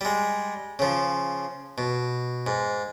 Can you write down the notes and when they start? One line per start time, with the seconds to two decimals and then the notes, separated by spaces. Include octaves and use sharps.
0.01 G3 G#3
0.79 C#3 F3
1.78 B2
2.47 G#2